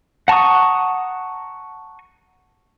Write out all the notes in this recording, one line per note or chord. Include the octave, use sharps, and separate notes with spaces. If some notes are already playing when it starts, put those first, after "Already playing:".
F#5 A5 A#5 C#6 D#6